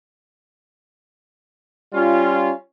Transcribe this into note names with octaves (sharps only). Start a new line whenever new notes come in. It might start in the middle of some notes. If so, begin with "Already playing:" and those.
G3 C#4 F4